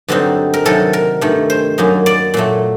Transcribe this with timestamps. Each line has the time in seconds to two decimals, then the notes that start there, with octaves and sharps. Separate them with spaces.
0.08 G2 D3 F#3 C4 D#4
0.54 A#4
0.65 C3 D#3 F#3 A4
0.93 A#4
1.21 G2 D#3 A3
1.50 C5
1.78 F#2 F#3 A#3 D#4
2.06 D5
2.34 A#2 F#3 A3